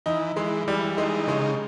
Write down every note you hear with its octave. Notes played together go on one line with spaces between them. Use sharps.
E3 D#4
E3 G#3
E3 G3
G#3 D#4
C#3 G#3